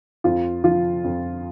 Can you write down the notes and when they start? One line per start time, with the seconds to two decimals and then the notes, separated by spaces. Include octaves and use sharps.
0.24 F2 F4
0.64 F3 F4
1.04 F2